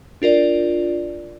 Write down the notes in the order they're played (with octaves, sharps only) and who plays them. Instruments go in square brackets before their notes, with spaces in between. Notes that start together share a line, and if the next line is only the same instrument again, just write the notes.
[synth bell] D4 F4 A#4 D5